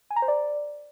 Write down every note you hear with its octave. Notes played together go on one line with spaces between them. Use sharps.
G#5
A#5
C5
D5